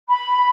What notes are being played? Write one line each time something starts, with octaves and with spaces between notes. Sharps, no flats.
B5